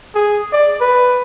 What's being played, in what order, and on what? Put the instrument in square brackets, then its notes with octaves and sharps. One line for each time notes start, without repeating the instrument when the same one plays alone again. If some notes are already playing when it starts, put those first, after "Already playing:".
[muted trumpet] G#4
D5
B4